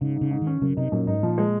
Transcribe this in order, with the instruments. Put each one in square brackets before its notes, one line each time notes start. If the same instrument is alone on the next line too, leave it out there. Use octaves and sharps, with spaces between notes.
[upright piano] G#2 [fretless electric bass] C#3
[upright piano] G#2
[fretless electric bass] C#3
[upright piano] G#2
[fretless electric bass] D#3
[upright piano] C#4
[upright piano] F#2 [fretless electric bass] C#3
[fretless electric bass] C3 [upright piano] D#4
[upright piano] F#2 [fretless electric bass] A#2
[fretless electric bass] G#2 [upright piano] D#4
[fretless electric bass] A#2 [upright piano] F3
[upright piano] G#3